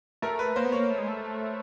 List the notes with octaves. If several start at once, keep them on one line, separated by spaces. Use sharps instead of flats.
A3 A#4
B4
A#3 C5
B3
A#3 C#5
A3
G#3
A3